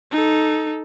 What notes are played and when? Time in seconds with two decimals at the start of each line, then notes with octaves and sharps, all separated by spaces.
0.11 D#4 A4